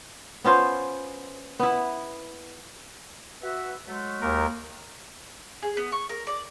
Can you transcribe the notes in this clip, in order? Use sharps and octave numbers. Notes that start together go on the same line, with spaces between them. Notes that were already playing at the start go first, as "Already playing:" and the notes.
B3 C#4 F4 C5
B3 E4
F#4 B4 E5
F#3 G#3 A3
D#2 A#4
G#4
B3
C#6
A#4
D5